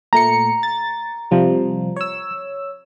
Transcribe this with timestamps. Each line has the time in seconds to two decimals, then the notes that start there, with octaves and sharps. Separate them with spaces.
0.13 A#2 A3 A#5 C#7
0.63 A6
1.31 C3 F3 G3
1.96 C#5 E6